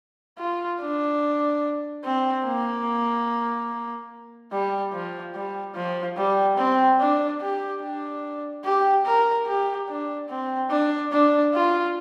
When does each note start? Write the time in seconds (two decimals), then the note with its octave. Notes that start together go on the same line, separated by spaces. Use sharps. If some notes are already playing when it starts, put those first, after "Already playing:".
0.38 F4
0.81 D4
2.04 C4
2.46 A#3
4.52 G3
4.93 F3
5.35 G3
5.75 F3
6.17 G3
6.58 C4
7.00 D4
7.41 G4
7.82 D4
8.65 G4
9.06 A#4
9.47 G4
9.88 D4
10.29 C4
10.70 D4
11.12 D4
11.54 F4